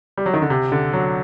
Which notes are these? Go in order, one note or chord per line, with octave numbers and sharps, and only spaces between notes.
G3
F#3
D#3
D3
C3
D3
F#3